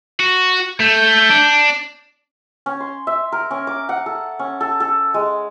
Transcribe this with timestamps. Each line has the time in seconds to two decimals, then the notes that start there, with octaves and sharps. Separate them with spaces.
0.20 F#4
0.80 A3 G6
1.30 D4
2.66 C#4
2.80 C6
3.07 E5
3.32 A#4
3.51 C#4
3.67 D6
3.89 F#5
4.06 A4
4.39 C#4
4.61 A4
4.80 A4
5.14 G#3